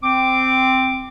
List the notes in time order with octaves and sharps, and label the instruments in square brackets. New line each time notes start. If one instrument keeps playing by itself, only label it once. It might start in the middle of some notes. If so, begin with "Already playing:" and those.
[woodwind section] C4 D6